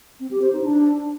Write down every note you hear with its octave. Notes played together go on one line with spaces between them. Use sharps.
C4
G4
C5
D#4
D4